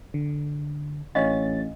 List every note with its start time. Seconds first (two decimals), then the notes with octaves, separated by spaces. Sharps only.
0.14 D3
1.15 A1 D4 C#5 D#5 F5 A6